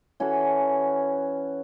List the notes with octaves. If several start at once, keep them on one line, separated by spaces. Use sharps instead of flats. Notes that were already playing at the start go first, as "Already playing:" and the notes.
E3 C#4 F#4 A4